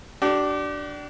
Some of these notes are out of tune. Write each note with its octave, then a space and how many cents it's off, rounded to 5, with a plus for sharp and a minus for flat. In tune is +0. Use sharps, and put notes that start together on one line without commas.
D4 +0 G4 -45